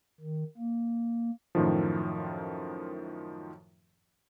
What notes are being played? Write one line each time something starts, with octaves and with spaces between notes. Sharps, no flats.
D#3
A#3
F#2 A2 D#3 F3